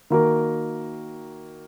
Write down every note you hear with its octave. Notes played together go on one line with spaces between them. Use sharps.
D#3 A#3 F#4 A#4